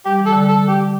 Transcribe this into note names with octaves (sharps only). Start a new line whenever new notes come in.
G3 G4
E3
A4
D3 G3
A4
G4